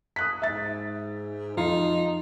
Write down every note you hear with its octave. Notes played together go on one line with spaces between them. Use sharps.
D#6 F#6 B6
G#2 E5 A6
F2 D#4 F4 C7